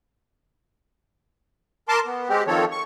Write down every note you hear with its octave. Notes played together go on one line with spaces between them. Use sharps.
A#4 A5 C6 D6
B3
G#3 C4 G4
D#3 F3 C4 A4 C#5
C#6